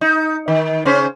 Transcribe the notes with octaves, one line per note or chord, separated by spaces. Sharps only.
D#4
D#3
C#3 C#4 C5